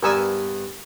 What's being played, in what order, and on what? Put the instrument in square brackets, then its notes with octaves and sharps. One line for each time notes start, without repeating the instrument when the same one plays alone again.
[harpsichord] G2 B3 D5 [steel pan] A#4 G#5 E6